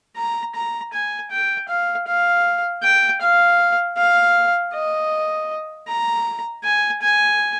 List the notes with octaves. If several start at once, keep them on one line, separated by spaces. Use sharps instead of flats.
A#5
A#5
G#5
G5
F5
F5
G5
F5
F5
D#5
A#5
G#5
G#5